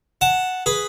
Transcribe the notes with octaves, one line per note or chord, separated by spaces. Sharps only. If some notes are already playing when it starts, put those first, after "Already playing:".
F#5 A5
G#4 B4